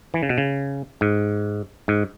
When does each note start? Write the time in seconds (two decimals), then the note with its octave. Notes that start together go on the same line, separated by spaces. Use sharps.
0.14 E3
0.23 C#3
0.29 B2
0.38 C#3
1.01 G#2
1.88 G#2